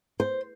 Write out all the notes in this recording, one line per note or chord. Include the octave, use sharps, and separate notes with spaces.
C5